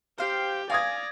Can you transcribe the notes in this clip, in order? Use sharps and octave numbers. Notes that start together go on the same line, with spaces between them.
G4 C5 F5 G5
D5 F5 G#5 D#6 G#6 A#6